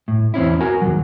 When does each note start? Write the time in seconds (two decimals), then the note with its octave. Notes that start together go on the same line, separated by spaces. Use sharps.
0.08 A2
0.34 E2 C4 C#4 E4
0.61 F#4 A#4 G#5
0.82 D#2 C3 F#3